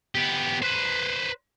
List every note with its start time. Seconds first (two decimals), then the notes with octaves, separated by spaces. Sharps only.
0.15 B3 G4
0.62 B4 C5